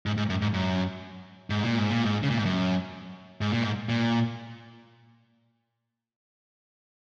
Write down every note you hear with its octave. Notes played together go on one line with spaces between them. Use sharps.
G#2
G#2
F#2
G#2
F#2
G#2
A#2
G#2
A#2
G#2
C#3
A#2
G#2
F#2
G#2
A#2
G#2
A#2